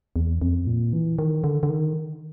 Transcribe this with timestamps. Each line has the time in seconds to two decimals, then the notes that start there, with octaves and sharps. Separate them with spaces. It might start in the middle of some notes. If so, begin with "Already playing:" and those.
0.16 E2
0.42 F2
0.67 A#2
0.93 E3
1.19 D#3
1.44 D3
1.63 D3
1.70 D#3